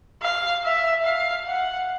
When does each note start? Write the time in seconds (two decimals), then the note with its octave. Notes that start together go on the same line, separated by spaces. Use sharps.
0.22 F5
0.64 E5
1.05 F5
1.47 F#5